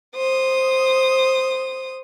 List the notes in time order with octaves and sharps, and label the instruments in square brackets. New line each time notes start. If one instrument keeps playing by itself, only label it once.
[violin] C5 D#6